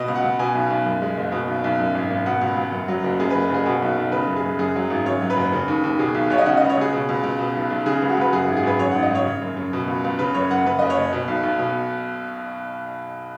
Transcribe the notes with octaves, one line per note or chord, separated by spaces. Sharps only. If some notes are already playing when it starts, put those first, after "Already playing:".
Already playing: B2 D#5
C#2
F#5
C#2
B2 G#5
B1
B1
F#2
G#3
F#1
B2
B1
B1
F#2
G#1
G#1
B2 F#5
C#2
C#2
F#2
F#3
F#1
F#2 G#4
F#1 B4
F#1 G#4
B2 F#4
B1
B1
C#3 B4
F#2
G#4
F#2
F#2 G#4
F#3
G#1
F#2 C#5
F#3
B4
F#1
C#3
D#2
D#2
B2 G#4
B1
B1 C#5
D#5
C#3 F#5
C#2 D#5
C#5
C#2 G#4
B2
C#2
C#2
B2
B1
B1
C#3 G#4
C#2
F#4
C#2 B4
F#2 G#4
G#1 F#4
G#4
G#1 B4
F#2 C#5
G#1 F#5
D#5
G#1 C#5
C#3
F#2
F#2
B2
C#2
C#2
C#3 B4
F#2 C#5
F#2 F#5
F#2 B4
F#1 D#5
C#5
F#1
B2
B1
B1
B2